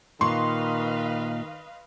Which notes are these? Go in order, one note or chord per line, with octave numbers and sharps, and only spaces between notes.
A#2 D#3 B4 D#5 F5 C6 C#6